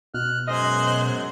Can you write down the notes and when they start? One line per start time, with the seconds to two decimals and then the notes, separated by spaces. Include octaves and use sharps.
0.14 B2 F6 F#6
0.48 F#2 G#3 C5 D#5 F#6 G#6